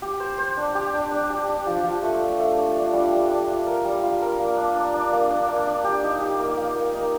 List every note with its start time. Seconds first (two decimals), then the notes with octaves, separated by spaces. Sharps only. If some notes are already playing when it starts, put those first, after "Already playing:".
0.02 G4
0.20 C5
0.38 C5
0.57 D4
0.75 G4
0.94 D4
1.11 D4
1.30 G4
1.48 D4
1.67 F3
1.84 F3
2.03 A3
2.20 A3
2.39 A3
2.58 D4
2.76 D4
2.93 G3
3.11 G3
3.30 D4
3.48 F4
3.66 A#4
3.85 G3
4.03 F4
4.21 A#4
4.40 A#3
4.57 D4
4.75 D4
4.94 D4
5.13 A#3
5.31 D4
5.48 A#3
5.66 D4
5.84 G4
6.04 D#4
6.22 G4
6.39 A#3
6.57 A#3
6.76 A#3
6.94 D#4